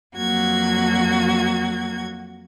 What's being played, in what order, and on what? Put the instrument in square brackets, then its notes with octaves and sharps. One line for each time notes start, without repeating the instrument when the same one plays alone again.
[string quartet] F2 F#3 A#3 F#4 G#6